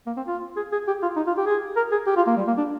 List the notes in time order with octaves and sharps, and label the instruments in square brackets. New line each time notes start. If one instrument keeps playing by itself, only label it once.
[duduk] A#3
C4
F4
G#4
G#4
G4
F4
D#4
F4
G4
G#4
A#4
G#4
G4
F4
A#3
G3
A#3
D4